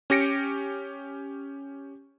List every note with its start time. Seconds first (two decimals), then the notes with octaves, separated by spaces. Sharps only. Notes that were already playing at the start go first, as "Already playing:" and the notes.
0.10 C#4 G4 A#6 C#7 D7